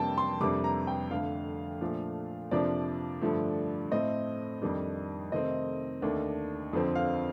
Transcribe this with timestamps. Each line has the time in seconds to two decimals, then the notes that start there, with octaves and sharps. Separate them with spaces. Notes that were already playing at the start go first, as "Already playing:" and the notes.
Already playing: F2 C3 G3 A#3 D4 G5 A5
0.18 C6
0.41 F2 C3 G3 A#3 D4 D6
0.64 A#5
0.87 G5
1.11 F2 D3 A3 F5
1.81 A#2 F3 A3 D4
2.51 F2 C3 F3 A#3 D4 D5
3.21 G2 D3 F3 A3
3.91 A2 A3 C4 D#5
4.62 F2 D#3 G3 D4
5.32 C3 D#3 A3 C4 D#5
6.02 D#2 D3 A3 D4
6.73 F2 D3 F3 C4
6.95 F5